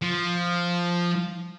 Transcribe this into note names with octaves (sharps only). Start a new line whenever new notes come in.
F3